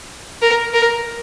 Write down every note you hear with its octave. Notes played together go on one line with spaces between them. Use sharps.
A#4
A#4